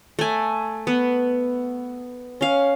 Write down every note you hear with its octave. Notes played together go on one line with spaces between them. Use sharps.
A3 G#5
B3
C#4 F5